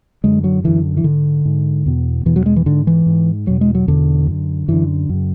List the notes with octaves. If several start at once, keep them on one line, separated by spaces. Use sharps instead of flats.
F#2 D3 G#3
F#3
F#2 D3 E3
E3
G#2 D3
G#2
E2 B2
E2 B2 E3
F#3
G#3
E3
G#2 D3
E3
G#2
E2 B2 F#3
G#3
F#3
E2 B2 D3
F#2 D3
F#2 D3 E3
F#2 C#3